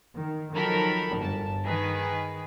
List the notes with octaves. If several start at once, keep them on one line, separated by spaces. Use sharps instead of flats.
D#3
D#3 F3 F#3 A4 A#4 B5
G1 A5
D#3 G#4 B4